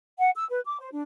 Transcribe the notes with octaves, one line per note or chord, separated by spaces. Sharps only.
F#5
E6
B4
D6
C5
D4